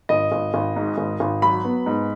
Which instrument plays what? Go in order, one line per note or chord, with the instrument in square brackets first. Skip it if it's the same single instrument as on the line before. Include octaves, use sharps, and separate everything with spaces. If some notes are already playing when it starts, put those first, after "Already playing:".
[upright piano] G#1 D#5
G#1
G#1
G#2
G#1
G#1
F#3 B5
B3
G#2